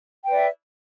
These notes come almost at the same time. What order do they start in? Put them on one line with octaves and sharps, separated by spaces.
G5 B4 D5 E5